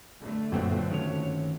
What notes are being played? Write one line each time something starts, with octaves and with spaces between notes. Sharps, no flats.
D3 A3
G1 F#2 A#2 C4 F#4
D#3 C#4 C#5